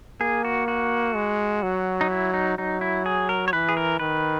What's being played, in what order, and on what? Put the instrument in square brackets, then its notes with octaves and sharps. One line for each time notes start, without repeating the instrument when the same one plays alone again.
[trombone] A#3 [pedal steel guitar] G#4
[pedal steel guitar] F#4
F#4
[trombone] G#3
F#3
[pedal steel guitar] D#4
E4
D#4
[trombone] F#3 [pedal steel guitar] D#4
[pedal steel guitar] E4
G#4
A#4
C#5
[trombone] E3 [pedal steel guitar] B4
[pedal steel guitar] G#4
A#4
[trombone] D#3 [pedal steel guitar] B4